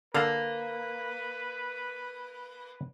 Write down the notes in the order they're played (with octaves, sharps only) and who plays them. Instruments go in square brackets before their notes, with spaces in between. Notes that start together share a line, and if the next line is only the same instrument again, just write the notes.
[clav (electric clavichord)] D3 F5 A5 [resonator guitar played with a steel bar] A#3 [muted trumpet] B4